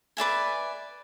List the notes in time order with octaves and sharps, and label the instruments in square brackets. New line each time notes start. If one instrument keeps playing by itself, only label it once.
[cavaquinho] B4 D5 E5 G#5